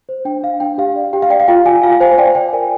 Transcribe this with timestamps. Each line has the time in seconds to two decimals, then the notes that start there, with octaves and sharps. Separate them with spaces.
0.09 C5
0.25 D4 G5
0.43 D4 F5
0.60 D4 G5
0.78 G4 F5
0.96 D5
1.13 G4 G5
1.22 F5
1.30 D5 G5
1.40 F5
1.48 F4 G5
1.66 F4 G#5
1.83 F4 F5
2.00 C5 G#5
2.18 D5 G5
2.35 D5 G5
2.53 A#4 G#5